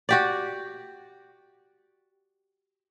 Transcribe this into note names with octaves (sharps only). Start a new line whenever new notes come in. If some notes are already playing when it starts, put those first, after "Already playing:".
F#4 G4 D5